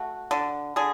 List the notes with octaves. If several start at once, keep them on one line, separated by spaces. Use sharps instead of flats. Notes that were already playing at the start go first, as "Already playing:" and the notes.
Already playing: A3 F#4
D3
D3 G#4